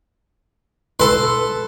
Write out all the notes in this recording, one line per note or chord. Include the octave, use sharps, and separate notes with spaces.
A4 B4 C6